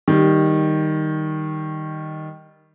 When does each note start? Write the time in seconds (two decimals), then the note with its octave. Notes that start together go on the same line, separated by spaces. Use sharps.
0.08 D#3 G3